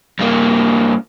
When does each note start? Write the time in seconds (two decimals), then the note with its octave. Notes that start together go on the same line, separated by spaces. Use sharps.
0.19 G2 A#3